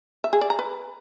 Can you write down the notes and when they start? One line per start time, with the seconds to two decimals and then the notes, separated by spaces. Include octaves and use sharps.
0.24 E5
0.33 G#4
0.41 D5
0.50 A#5
0.59 B4